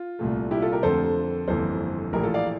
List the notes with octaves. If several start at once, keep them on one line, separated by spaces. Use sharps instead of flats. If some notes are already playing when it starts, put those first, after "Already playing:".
Already playing: F4
C2 A#2 A3
E4 G4
F4 A4
G4 A#4
F2 D3 A3 A4 C5
G1 F2 E3 A#3 A4 C5
A#1 A2 E3 G4 A#4
F4 A4
D5 F5